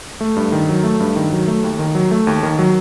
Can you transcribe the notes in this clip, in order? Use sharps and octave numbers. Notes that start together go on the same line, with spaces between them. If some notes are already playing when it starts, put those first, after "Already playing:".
A3
G2
D#3
F#3
A3
G2
D#3
F#3
A3
D#2
D#3
F#3
A3
D#2
D#3
F#3